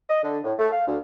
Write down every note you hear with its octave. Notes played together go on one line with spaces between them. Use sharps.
D#5
D3
A2
A3
F5
D2